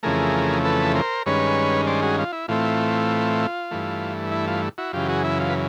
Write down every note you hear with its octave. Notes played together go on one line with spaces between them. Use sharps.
F2 C#3 E3 A3 G#4 A#4
A4 B4
A#4 C5
G2 D#3 G#3 C#4 B4 C#5
C5 D5
F#4 G#4
F4
E4
A2 E3 A3 C4 F4
G2 E3 A3
E4
F4
E4 F#4
F#2 C#3 E3 F4 G4
F#4 G#4
E4
F4
B4